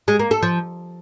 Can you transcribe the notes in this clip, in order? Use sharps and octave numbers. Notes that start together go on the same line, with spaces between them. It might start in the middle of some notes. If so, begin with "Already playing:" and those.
G#3
A#3
A4
F3